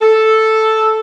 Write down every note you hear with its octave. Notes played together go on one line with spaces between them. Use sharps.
A4